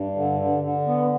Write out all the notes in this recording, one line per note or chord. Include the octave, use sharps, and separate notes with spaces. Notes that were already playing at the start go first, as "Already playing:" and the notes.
Already playing: G2
D3
D3
D3
B3